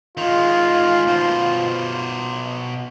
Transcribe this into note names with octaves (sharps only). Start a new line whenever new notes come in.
D#3 G#3 F4
B2 C5